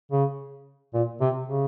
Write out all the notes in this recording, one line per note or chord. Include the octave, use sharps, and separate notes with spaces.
C#3
A#2
C3
C#3